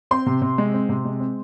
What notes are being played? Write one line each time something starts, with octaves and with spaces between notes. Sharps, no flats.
C4 C6
C3
C3
G#3
C4
C3
G#3
C4